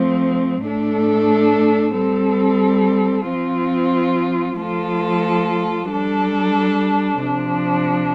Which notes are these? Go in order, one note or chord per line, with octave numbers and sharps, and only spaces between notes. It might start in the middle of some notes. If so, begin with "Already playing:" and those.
Already playing: F3 A3 C4
A2 A3 D4 A4
G3 C4 A4
F3 C4 F4
F3 A3 F4 A4
G3 D4 A4
C3 F3 D4